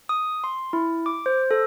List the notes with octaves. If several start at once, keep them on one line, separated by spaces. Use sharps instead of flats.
D#6
C6
E4
D6
C5
A4